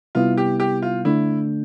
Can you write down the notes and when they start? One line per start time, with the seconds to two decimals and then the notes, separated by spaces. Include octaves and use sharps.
0.15 C3 G3 B3 E4 F4
0.38 G4
0.60 G4
0.82 F4
1.05 D3 A3 D4 E4